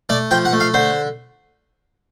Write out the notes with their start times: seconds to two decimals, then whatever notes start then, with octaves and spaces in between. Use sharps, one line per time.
0.09 A3 D5
0.31 F3 G5
0.45 F#5
0.53 A3
0.60 F5
0.74 D3 C5